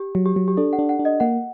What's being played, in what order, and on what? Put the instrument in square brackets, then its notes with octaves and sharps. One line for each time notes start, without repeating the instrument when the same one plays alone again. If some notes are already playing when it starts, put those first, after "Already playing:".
Already playing: [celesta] G4
[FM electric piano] F#3
[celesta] G4
[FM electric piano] F#3
[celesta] G4
[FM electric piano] D4 [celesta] A4
[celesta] F#5
[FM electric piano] D4
[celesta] F#5
[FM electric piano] D4
[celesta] D#5
[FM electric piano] A#3 [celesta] F#5